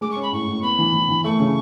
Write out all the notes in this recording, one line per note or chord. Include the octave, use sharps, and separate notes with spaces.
G#3 D6
C#6
C#4
B5
A2 C#6
A2
B3 B5
E3
E3
E3
A3 C#6
C#3